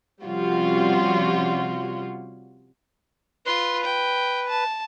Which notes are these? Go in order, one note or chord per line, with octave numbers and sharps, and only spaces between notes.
C3 F3 G3 C#4 F4 F#4
F4 B4 C6
G5
A5